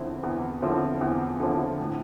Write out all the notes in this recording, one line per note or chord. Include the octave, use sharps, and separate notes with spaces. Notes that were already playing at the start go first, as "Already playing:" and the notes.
Already playing: E2 D3 F3 C4 E4
E2
D3 F3 C4 E4
E2
D3 F3 C4 E4
A2